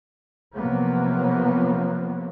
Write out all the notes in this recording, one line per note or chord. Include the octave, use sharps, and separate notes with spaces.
C3 F3 F#3 A#3 B3